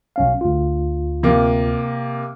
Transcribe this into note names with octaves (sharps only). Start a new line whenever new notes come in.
B1 C#4 F5
D2 F4
C3 A#3